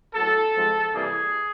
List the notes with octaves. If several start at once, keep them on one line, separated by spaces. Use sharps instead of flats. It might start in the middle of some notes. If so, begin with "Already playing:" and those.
A2 F#3 B3 A4
G#2 F3 G#3 C4
C3 E3 G3 A#3 G#4